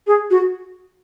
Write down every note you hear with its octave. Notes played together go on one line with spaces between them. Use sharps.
G#4
F#4